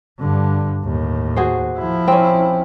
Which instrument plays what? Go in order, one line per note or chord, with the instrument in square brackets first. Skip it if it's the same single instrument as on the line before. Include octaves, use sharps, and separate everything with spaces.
[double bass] G2 D3
D#2 A2
[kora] F#4 G#4 C5
[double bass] F3 E4
[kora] C4 C#4